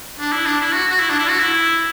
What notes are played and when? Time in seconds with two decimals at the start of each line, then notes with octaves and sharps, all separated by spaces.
0.19 D4
0.32 E4
0.46 D4
0.60 E4
0.73 F#4
0.90 F#4
1.00 E4
1.10 D4
1.19 E4
1.30 F#4
1.39 E4